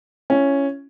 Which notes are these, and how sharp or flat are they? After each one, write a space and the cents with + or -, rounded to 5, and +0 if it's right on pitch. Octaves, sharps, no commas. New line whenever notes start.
C#4 +0 E4 +35